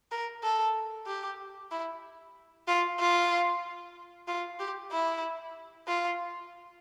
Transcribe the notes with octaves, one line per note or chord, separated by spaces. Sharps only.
A#4
A4
G4
E4
F4
F4
F4
G4
E4
F4